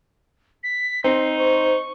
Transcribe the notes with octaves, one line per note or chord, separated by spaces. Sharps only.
B6
C4 D#4 C6
C5 C#6